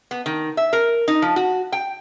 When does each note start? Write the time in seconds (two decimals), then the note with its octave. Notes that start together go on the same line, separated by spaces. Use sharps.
0.11 B3
0.26 D#3
0.57 E5
0.73 A#4
1.08 D#4
1.22 F3
1.36 F#4
1.72 G5